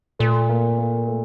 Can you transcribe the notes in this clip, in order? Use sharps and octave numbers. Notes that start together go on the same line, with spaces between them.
A#2 A3
A#3
A#3
A3